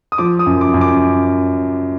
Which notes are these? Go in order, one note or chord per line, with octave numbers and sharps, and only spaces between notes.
D#6
F3 D6
D#6
F#2
D6
F#2
D6